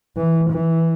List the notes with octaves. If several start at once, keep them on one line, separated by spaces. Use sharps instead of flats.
E3
E3